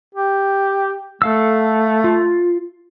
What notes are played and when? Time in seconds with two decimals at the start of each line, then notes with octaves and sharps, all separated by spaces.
0.15 G4
1.22 A3 A4 F5 E6
2.04 F4